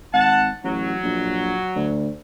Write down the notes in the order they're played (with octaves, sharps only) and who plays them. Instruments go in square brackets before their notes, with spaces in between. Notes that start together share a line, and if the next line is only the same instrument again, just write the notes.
[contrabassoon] G#1 [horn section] F#5 A5
[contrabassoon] A1 [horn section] F#3
[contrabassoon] A#1
D2